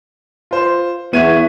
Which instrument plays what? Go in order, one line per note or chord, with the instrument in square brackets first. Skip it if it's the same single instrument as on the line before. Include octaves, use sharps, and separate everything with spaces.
[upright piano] F4 C5
[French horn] E2 [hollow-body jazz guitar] B3 [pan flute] E5 [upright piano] C#6 G#6 D#7